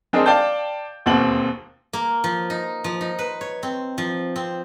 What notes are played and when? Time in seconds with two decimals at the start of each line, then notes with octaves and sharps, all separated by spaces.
0.13 G#3 C4 D4 D#4 G#4 A#4
0.26 D5 F5 G5 A5 G6
1.06 E1 D#2 B2 C4 F#5 F#7
1.93 A#3
2.24 F3
2.50 D#4
2.84 F3
3.01 D#4
3.19 B4
3.41 C#5
3.63 C4
3.98 F3
4.36 C4